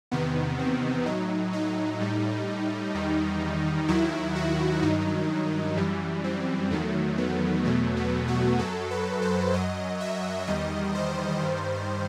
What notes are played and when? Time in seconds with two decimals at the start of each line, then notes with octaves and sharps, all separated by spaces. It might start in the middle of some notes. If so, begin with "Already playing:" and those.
0.11 E2 C3 D#3 B3
0.59 C4
1.06 A2 F#3 D#4
1.53 D#4
2.00 A2 G3
2.95 E2 D#3 G3
3.88 D#2 D#3 F#3 E4
4.35 F#4
4.83 G2 D#3 F#3 D#4
5.76 F#2 E3 G3
6.24 C4
6.71 E2 D#3 F#3 A3
7.18 B3
7.65 E2 B2 F#3 A3
7.96 B3
8.28 F#4
8.59 F#2 F#3 A4
8.91 B4
9.22 C5
9.53 F#2 F#3 D#5
10.00 E5
10.47 E2 D#3 G3 D#5
10.95 C5
11.42 G2 D#3 G3